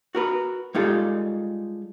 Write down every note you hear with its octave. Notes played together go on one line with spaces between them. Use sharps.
F#4 A#4 B4
G3 G#3 D#4 F4 A4